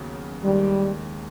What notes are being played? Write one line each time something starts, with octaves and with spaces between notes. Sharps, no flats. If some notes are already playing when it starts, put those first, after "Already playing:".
Already playing: D#2 C#3 F#3 B3
D#2 D#3 G3 G#3